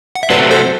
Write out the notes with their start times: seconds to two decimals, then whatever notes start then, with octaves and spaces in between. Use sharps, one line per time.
0.15 F#5
0.23 E5
0.30 C3 F#3 A3 B4 D5
0.51 A4 C5